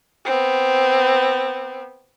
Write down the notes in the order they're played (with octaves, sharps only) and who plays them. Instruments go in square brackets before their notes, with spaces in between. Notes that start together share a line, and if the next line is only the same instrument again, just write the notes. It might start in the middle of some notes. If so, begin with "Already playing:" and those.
[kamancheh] B3 C4